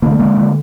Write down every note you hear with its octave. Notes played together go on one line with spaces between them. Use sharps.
D3 A#3
A3
D3 G#3 A#3
D3